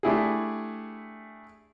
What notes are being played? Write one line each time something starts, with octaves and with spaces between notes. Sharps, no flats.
A3 D4 E4 G4 G#4